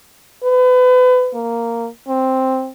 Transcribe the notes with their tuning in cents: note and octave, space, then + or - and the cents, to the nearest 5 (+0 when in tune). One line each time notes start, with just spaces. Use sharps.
B4 +30
A#3 -5
C4 +0